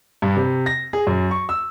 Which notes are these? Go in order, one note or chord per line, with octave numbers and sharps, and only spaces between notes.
G2
C3
A#6
G#4
F#2
C#6
E6